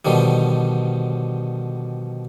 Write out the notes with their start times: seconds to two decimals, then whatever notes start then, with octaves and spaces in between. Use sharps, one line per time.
0.05 B2 D3 D#3 F3 G3